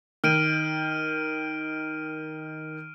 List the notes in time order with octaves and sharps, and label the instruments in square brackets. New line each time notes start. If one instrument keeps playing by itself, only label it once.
[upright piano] D#3 [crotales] F6 D7 D#7